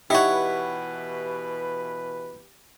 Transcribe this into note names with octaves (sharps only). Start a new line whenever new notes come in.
B2 E3 D#4 E4 G4 B4 C#5 F#5